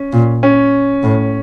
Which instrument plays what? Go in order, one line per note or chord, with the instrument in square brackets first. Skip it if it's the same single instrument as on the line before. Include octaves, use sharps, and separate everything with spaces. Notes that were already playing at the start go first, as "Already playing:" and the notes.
Already playing: [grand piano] C#4
[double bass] A#2
[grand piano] C#4
[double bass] A2